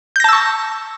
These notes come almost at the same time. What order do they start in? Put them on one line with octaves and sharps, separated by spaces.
G6 A#6 A5 E6 C#6